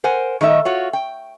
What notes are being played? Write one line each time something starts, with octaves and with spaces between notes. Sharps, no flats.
A#4 C5 F#5 G#5
D#3 A3 D#4 E5
F4 F#4 C#5
G5